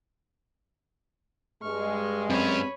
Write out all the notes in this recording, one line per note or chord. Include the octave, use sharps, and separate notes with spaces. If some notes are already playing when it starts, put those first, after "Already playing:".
G2 G#3 C#6 F6
F#2 C4 C#4 C#5 B5